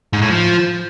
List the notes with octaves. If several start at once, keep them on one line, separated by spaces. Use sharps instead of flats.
G#2
A2
F3